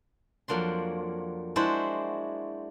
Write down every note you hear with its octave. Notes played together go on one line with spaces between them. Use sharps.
F2 F#3 A#3 D4 C6
G#3 D4 E4 F#4 C5